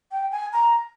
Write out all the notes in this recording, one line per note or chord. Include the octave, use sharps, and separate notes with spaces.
G5
G#5
A#5